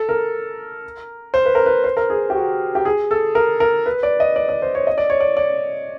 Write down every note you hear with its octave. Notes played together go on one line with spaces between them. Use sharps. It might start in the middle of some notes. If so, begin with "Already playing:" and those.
Already playing: A4
A#4
C5
B4
A#4
B4
C5
A#4
G#4
G4
F#4
G4
G#4
A4
A#4
A#4
B4
D5
D#5
D5
D5
C5
C#5
D#5
D5
C#5
D5
D5